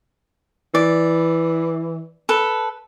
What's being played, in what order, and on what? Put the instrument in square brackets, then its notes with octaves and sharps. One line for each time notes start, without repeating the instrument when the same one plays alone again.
[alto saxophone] E3 [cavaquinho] D5
[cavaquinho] A4 B4